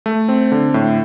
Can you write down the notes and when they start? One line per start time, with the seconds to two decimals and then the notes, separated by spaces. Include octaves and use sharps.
0.06 A3
0.28 C4
0.52 D3
0.74 A2